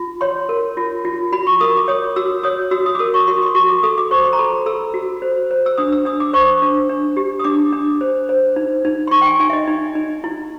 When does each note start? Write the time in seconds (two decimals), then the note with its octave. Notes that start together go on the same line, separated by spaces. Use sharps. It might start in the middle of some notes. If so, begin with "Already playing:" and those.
Already playing: F4
0.21 C#5 C6
0.49 A#4
0.77 F4
1.05 F4
1.32 F#4 B5
1.47 C#6
1.60 A#4 D#6
1.77 D6
1.88 C#5 D#6
2.16 F#4 E6
2.43 C#5 D#6
2.71 F#4 E6
2.86 D#6
2.95 D6
2.99 A#4 D#6
3.14 C#6
3.27 F#4 C6
3.42 C6
3.55 F#4 C#6
3.69 D6
3.83 A4 D#6
3.98 D6
4.11 C5 C#6
4.24 C6
4.33 A#5
4.38 A4 B5
4.66 A4 E6
4.94 F#4
5.22 C5
5.51 C5
5.66 E6
5.78 D4 D#6
5.92 E6
6.05 D4 D#6
6.20 D6
6.33 C5 C#6
6.62 D4
6.89 D4
7.17 G4
7.40 D#6
7.44 D4 D6
7.73 D4
8.01 C5
8.29 C5
8.56 D#4
8.85 D#4
9.07 C6
9.11 D#4 C#6
9.21 G5
9.26 G#5
9.40 D#4 G#5
9.50 E5
9.53 D#5
9.67 D#4
9.95 D#4
10.24 E4